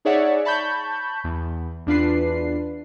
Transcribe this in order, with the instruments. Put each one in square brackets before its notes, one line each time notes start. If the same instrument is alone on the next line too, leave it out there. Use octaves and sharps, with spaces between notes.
[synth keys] D#4 G#4 C#5 D5 E5 F#5
A5 B5 C#6 G6
E2
E2 D4 F4 B4 C7